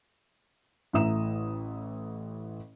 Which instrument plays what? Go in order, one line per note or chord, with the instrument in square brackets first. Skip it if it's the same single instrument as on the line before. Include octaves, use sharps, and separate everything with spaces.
[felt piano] A1 A2 E5 A#5 D#6 E7